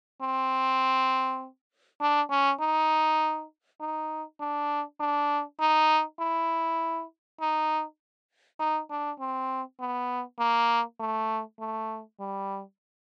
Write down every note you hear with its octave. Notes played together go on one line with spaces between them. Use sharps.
C4
D4
C#4
D#4
D#4
D4
D4
D#4
E4
D#4
D#4
D4
C4
B3
A#3
A3
A3
G3